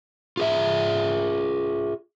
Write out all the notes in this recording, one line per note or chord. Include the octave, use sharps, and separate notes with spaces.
F4 G#4 E5